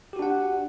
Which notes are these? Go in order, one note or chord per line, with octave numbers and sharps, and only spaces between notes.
D4 F#4 G4 F#5